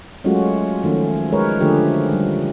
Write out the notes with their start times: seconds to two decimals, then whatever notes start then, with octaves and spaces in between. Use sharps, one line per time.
0.24 F#3 G#3 A3 C#4 F4 F#4
0.84 D#3 F3 A3 C#4
1.32 G#3 A#4 B4 C#5
1.60 D3 F3 A3 G4 G#4
2.13 G3